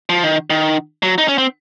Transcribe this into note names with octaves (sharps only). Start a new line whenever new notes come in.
F3
D#3
D#3
F#3
D#4
C#4
C4